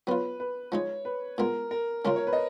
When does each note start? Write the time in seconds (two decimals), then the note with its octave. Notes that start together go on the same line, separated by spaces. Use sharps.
0.07 F#3 B3 F4 B4
0.40 B4
0.72 F3 G#3 D#4 C#5
1.05 B4
1.38 A#2 G#3 B3 A#4
1.71 A#4
2.05 C#3 G#3 C#4 F4 A#4
2.16 C#5
2.27 B4
2.33 D#5